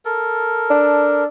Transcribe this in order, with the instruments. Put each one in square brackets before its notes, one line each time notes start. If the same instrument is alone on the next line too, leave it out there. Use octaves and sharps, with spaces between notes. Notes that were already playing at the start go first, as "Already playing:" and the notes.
[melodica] A4 A#4
[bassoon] D4